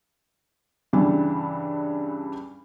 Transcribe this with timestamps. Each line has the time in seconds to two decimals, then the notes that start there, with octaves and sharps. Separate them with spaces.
0.93 G2 C#3 E3 G3 D4